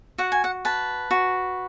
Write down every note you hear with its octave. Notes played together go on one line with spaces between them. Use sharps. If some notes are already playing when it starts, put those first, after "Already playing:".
F#4 F#5
G#5
F#5
B4 A5
F#4